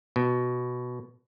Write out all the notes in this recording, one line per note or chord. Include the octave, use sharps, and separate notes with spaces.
B2